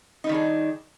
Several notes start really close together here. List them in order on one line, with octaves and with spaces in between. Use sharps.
D#4 G3 D#3 D4 G#4